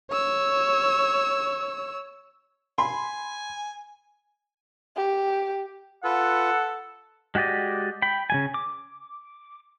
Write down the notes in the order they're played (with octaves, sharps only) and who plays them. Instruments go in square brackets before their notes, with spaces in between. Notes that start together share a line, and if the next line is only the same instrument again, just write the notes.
[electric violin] C#5 E6
[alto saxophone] G#5 [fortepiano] B5 C6
[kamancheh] G4
[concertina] F4 B4 [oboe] A4 [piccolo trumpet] F#5
[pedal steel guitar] G#3 F#4 G4 D5 D#5
G5 B5
C#3 G3 G#5
D6